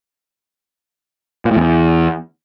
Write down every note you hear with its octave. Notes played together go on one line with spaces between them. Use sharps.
A#2
A2
E2